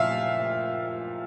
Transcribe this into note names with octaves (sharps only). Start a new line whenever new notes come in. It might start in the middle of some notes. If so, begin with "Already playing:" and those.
Already playing: A#2 F3 E5 F5